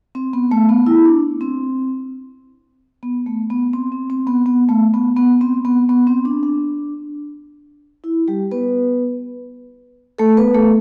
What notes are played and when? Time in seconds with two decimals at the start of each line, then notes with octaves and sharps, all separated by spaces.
0.15 C4
0.33 B3
0.51 A3
0.69 B3
0.87 E4
1.05 D4
1.41 C4
3.03 B3
3.26 A3
3.50 B3
3.73 C4
3.92 C4
4.10 C4
4.27 B3
4.46 B3
4.69 A3
4.94 B3
5.17 B3
5.41 C4
5.65 B3
5.89 B3
6.07 C4
6.25 D4
6.43 D4
8.04 E4
8.28 G3 G4
8.51 B3 B4
10.18 A3 A4
10.37 B3 B4
10.54 A3 A4